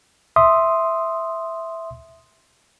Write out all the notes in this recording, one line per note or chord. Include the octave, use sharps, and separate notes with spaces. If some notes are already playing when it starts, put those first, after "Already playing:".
E5 C6 D#6